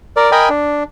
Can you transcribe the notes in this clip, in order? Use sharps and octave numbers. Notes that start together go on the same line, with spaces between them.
A#4 D5
A#4 D#5 G5 G#5 B5
D4